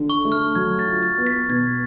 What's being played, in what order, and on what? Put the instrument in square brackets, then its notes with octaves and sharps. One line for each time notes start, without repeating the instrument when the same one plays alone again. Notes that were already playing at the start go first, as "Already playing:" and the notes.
Already playing: [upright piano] D3
[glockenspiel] C#6
[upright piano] A3
[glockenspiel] F6
[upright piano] F#3 [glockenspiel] G#6
[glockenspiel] A6
[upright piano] F4
[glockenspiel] A6
[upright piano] B3
[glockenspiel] B6
[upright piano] B2 [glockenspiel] G#6